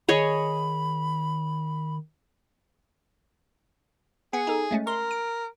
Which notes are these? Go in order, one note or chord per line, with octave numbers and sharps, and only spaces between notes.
D#3 G#4 C#5 D#5 B5
B3 G#4 F#5
D#4 A4
G#3 A3 C#4
A#4 C6
D7